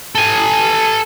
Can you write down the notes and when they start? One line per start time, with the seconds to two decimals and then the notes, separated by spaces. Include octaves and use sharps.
0.15 A4 G#5